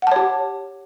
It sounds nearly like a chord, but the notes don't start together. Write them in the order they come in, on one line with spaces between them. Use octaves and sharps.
F#5 A5 C#5 G4